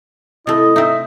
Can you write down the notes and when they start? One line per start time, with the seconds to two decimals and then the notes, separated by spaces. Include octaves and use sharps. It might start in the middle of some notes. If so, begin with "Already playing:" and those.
0.47 C3 A3 E4 D#5
0.76 C4 D#4 E5